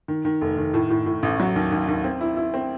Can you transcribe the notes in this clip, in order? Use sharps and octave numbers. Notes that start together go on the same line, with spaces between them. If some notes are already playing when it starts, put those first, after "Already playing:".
D#3
D#3
F1
D#3
A2
A2
A2
A1
F#3
D#2
D#2
D#2
C4
E4
E4
C4